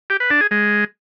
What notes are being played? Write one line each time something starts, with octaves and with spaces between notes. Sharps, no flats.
G4
B4
D4
G#4
G#3